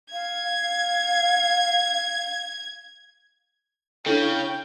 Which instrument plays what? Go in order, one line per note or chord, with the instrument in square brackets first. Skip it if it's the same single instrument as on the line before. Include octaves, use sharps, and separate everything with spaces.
[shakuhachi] F5 [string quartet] G#6
[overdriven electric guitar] C#3 [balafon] D4 E4 A4 [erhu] G5